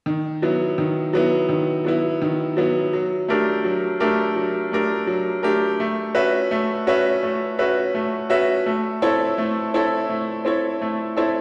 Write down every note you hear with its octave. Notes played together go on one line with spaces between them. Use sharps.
D#3
F#3 B3 E4
D#3
F#3 B3 E4
D#3
F#3 B3 E4
D#3
F#3 B3 E4
F#3
A3 D4 G4 A#4
F#3
A3 D4 G4 A#4
F#3
A3 D4 G4 A#4
F#3
A3 D4 G4 A#4
A3
C#4 F#4 B4 E5
A3
C#4 F#4 B4 E5
A3
C#4 F#4 B4 E5
A3
C#4 F#4 B4 E5
A3
C4 E4 A4 C#5
A3
C4 E4 A4 C#5
A3
C4 E4 A4 C#5
A3
C4 E4 A4 C#5